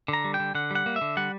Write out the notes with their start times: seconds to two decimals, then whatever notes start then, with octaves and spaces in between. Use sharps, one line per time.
0.08 D3
0.13 A#5
0.24 G3
0.34 G5
0.40 D3
0.55 D3 F#5
0.71 G3 F#5
0.86 A#3
0.96 E5
1.01 D3
1.17 G3 F#5